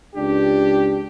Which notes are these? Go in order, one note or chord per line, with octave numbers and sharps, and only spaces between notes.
C#2 D4 G4